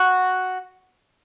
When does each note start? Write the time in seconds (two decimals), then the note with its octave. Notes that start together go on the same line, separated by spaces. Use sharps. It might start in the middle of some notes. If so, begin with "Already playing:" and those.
Already playing: F#4